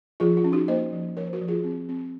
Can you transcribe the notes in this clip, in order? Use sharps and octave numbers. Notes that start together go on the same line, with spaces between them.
F3 F4 G#4
F4
C#4
D#4 F#4
A#3 C5 D#5
F3
F3 A#4 C#5
C5
F#4 A#4
F3
F4 G#4
C4
C4